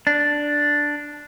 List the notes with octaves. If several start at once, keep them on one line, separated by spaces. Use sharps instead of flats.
D4